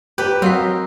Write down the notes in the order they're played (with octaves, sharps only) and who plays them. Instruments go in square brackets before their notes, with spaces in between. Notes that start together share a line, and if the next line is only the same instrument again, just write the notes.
[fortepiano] G4 [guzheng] B4
[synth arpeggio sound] F#3 F5 B6 [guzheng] C4 [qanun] F#4 A#4 D#5